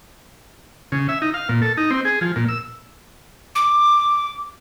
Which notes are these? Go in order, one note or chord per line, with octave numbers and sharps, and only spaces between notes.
C#3
E5
D#4
F5
A#2
A4
D#4
C4
G#4
F3
A#2
E6
D6